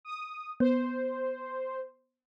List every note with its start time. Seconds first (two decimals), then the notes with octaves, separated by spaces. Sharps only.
0.05 D#6
0.60 B3 C5